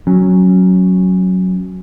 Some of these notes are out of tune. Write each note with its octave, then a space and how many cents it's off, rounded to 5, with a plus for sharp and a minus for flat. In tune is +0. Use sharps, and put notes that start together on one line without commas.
F#3 +0 C#4 -10